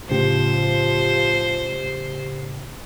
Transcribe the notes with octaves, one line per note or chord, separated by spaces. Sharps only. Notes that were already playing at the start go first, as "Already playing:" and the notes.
A2 C#3 F3 G4 C5